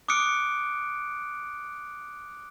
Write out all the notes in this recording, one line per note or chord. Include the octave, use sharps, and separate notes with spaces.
D6 D#6 F6 F#6 C#7 D7